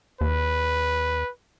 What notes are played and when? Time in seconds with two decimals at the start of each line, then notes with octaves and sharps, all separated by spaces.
0.21 D#2 B4